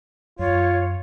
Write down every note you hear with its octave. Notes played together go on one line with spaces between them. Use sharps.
F#2 F4 C#5